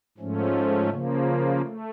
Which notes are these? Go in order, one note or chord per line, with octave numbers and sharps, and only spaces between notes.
G#2 F3 A3 C#4
C#3 F3 A#3
A3